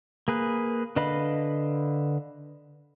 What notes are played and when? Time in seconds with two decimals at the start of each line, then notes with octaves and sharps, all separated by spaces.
0.28 A#3 G#4 B4
0.96 D3 B4 D#5 F5 B5